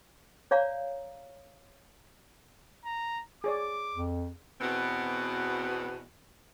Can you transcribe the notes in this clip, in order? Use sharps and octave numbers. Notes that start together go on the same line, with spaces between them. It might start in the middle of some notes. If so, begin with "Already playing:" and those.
C#5 D5 F5 A#5
A#5
G#4 C#5 D5 D6
F2
E2 B2 B3 C4 F#4